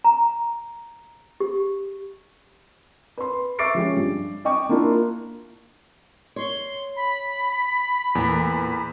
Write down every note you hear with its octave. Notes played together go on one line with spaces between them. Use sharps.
A#5
G4
B4 C6
E5 C#6 D6 A6 C7 D7
F3 G#3 C#4 G4
G2
D#5 G5 C#6 D6
A#3 D4 E4 F4 A#4
C#5 C6
B5
E2 A#2 A3